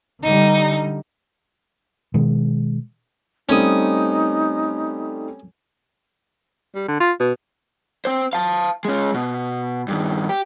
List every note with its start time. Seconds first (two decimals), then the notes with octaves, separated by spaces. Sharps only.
0.24 D3 G3 D#4
2.14 B2 D#3 G#3
3.49 G3 A3 C4 C#4 D#4 D#6
6.75 G3
6.88 D3
7.00 F4
7.20 B2
8.05 C4 C5
8.33 F5 A5
8.85 G#3 C#4
9.14 B2
9.88 G2 D#3
10.29 G4